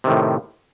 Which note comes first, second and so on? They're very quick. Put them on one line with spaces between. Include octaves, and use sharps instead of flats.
C3 D#3 A2